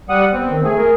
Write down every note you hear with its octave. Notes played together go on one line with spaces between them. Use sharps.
G3 F#5 D#6
B3 C4
D#3
A3 G#4
A#4